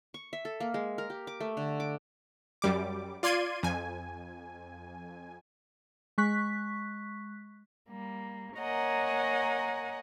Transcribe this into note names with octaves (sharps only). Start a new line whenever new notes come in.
C#6
E5
A4
A#3
G#3
A#4
G4
D6
A3
D3
D6
F#2 G3 D6
F4 D5 C6 G#6 D#7
F2 G#5
G#3 C#6 F#6 B6
G3 A#3
A#3 A#4 C#5 D#5 F#5 G#5